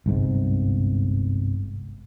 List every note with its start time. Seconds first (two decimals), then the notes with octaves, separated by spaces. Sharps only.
0.06 G1 C2 G#2